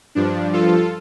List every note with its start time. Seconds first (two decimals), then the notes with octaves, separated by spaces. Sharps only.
0.15 G2 F3 D4
0.53 F4 A4